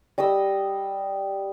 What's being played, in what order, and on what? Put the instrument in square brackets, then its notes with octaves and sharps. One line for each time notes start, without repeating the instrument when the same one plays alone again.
[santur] G3 D#5 D#6 E6